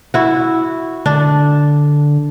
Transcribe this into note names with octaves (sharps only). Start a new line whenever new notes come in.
E4 F#4
D3 D4